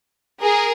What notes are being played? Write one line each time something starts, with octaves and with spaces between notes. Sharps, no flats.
G#4 A#4